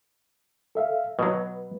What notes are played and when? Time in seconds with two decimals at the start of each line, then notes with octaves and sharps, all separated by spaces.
0.75 A4 E5 F5
1.19 B2 F#3 B4